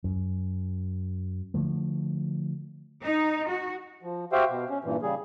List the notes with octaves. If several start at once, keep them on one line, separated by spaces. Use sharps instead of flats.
F#2
D3 F3 A3
D#4
F#4
F3
F#4 G4 C5 E5 F5 G5
B2
C#4
G2 A#2 E3
C#3 G3 G#4